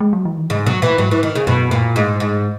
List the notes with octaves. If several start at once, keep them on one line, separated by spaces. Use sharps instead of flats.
G#3
F#3
E3
D#3
G#2 C#3
B2 F#3
A#2 E3
G#2 F#3
E3
D#3
C#3
F#2 B2
A#2
G#2
G#2